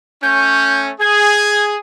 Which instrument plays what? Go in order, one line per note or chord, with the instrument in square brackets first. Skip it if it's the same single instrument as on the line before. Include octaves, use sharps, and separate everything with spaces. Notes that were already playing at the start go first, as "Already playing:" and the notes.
[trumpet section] A3 C#4 [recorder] G6
[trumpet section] G#4 [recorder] G#6